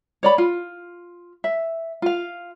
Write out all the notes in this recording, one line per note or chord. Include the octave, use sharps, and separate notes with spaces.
C#5 D5 B5
F4
E5
F4 F5